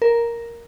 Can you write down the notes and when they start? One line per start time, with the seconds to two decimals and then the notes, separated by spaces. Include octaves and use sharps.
0.02 A#4